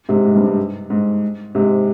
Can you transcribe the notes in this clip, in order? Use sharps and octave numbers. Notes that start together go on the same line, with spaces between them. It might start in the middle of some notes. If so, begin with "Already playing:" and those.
G#2 C3
G#2
G2
G#2
G#2
G#2 C3